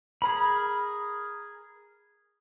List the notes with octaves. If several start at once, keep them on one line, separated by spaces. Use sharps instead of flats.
G#4 A#4 B5